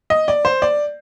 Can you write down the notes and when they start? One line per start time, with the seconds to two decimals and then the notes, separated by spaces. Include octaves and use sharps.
0.10 D#5
0.28 D5
0.45 C5
0.62 D5